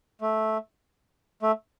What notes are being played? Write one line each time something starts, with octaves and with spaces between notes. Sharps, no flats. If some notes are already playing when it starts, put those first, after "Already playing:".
A3
A3